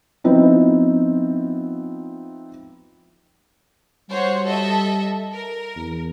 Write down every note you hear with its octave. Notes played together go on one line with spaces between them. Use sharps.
F3 B3 C4 D#4 E4
G3 F#4 C5 C#5
A4 D#5 E5
A#4
E2